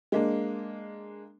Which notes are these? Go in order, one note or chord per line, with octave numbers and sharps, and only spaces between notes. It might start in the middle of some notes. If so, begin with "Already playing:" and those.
G#3 A#3 D4